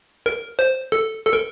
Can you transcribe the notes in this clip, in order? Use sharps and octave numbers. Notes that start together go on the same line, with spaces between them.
A#4
C5
A4
A4
A#4